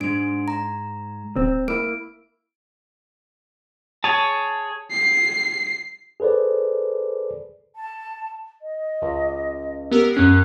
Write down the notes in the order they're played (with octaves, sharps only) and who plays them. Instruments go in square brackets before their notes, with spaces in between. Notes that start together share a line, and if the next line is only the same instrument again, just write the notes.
[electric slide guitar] G#2 G#3 [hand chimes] D4 D7
[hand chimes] A#5
[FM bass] D1 [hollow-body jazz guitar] C4
[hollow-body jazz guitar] A#3 E4 [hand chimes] D7
[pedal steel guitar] G#4 C#5 [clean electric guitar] A5
[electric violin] C7
[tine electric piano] G#4 A4 B4 C5 D5
[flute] A5
D#5
[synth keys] C#2
[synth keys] B3 G4 A#4 [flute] E6
[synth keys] F#2 C#4 C7 [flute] F#6